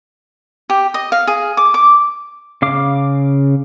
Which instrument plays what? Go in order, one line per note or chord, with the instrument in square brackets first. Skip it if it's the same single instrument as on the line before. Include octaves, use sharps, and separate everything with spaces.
[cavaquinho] G4
D#5
F5
G#4
D6
D6
[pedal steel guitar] C#3 F5 D6